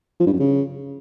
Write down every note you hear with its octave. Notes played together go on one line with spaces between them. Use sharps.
F3
G2
F#2
C#3